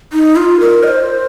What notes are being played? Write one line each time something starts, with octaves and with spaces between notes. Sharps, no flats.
D#4
F4
A#4
D#5
C5